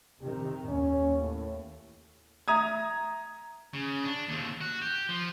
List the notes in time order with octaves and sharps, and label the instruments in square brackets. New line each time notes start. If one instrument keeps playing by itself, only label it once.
[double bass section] C3 D#3 [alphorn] G4
[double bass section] D#2 [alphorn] C#4
[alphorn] A2
[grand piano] E5 A#5 D#6 G#6
[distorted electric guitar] C#3
D4
D#2 C3
F#4
G4
F3